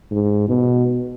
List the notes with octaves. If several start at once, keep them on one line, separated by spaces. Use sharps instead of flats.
G#2
B2